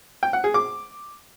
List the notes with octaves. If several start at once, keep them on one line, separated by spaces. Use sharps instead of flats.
G5
F#5
G#4
D6